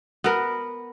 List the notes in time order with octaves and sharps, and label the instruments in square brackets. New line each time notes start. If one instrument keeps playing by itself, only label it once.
[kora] B3 A#4